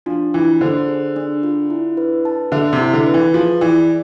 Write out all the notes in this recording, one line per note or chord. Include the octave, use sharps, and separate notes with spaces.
F3 D4
E3 F4
D3 C5
G#4
D4
F4
E4
B4
A5
D3 E5
C3
E4
D3
B4
E3
F3 G#4
E3 D5